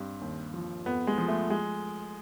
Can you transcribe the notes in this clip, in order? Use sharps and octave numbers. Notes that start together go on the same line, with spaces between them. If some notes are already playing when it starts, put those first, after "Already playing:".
Already playing: G2 C4
D#2
F3
F2 B3
G#3
F3
A3
G#3